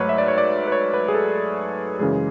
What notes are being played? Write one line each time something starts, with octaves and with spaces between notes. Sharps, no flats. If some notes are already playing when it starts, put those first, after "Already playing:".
Already playing: G#2 F#3 A3 B4 C#5
E5
D5
C#5
D5
B4
C#5
B4
G#4
A4
F#2 C#3 E3 G#3 G#4